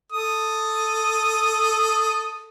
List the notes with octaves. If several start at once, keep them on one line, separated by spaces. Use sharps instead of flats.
A4 D#6